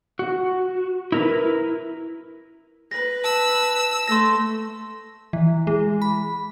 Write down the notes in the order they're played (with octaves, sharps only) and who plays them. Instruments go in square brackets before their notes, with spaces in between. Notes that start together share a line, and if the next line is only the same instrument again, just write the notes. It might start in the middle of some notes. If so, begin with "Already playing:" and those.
[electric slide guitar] F#4
E4 A#4 B4
[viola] B4 [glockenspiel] A#6
[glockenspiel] A5 [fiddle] E6
[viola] A3 [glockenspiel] C6 A#6
[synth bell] E3
G#3
B5